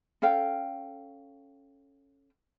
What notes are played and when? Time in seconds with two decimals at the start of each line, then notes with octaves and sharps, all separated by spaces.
0.22 C#4 A4 F5 G5